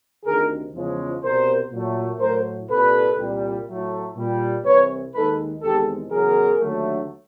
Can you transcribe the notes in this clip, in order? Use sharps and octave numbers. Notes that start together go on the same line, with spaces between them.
D2 C3 D#3 G#4 A#4
E2 C#3 F3 G#3
C2 B2 G3 A#4 C5
A#2 F#3 A3
A2 F#3 A3 A#4 C5
C2 A#2 G3 A4 B4
C2 A#2 G3
A2 F#3 A3
A#2 G3
C2 C3 E3 B4 C#5
D#2 D#3 G#3 A4 B4
E2 C3 D#3 G#3 G4 A4
E2 C#3 F#3 G#4 A#4
D#2 D3 F#3 A3